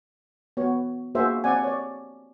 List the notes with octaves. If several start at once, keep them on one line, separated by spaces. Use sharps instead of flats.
B3 F#4 C#5
A#3 D4 F#4 G#4 C5 E5
C4 D5 F#5 G#5
C#5 D5